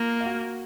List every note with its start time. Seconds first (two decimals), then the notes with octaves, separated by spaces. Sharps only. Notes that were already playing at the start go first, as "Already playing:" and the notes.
Already playing: A#3 F4 F5
0.21 F5
0.26 F#4 F#5